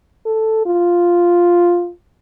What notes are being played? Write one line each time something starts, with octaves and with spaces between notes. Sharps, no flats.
A4
F4